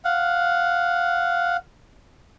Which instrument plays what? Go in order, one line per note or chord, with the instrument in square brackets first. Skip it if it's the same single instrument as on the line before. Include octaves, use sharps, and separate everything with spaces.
[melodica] F5 F#5